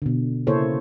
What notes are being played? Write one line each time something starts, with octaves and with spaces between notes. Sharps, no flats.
B2 D3
C#3 A#3 E4 A4 C5 C#5